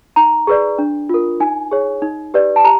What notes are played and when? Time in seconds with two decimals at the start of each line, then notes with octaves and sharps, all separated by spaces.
0.16 D#4 A#5
0.47 G#4 B4 D5
0.78 D4
1.09 F4 A#4
1.40 D#4 G#5
1.71 G#4 C#5
2.02 D#4
2.34 G4 B4 D5
2.56 A5
2.64 G4 A#5